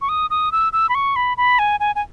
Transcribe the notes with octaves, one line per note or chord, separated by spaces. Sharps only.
C#6
D#6
D#6
E6
E6
B5
C#6
B5
B5
G#5
G#5
G#5